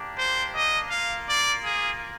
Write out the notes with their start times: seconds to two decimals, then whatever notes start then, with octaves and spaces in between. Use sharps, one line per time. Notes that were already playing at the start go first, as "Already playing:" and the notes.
Already playing: A#3 D4 G4
0.17 C5
0.54 D#5
0.90 A#3 F4 F5
1.26 D5
1.63 G#4